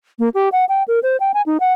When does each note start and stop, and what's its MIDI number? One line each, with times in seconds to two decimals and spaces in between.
0.19 0.29 58
0.34 0.49 67
0.52 0.65 78
0.69 0.83 79
0.88 1.00 70
1.03 1.17 72
1.20 1.32 79
1.34 1.42 80
1.46 1.58 63
1.60 1.73 78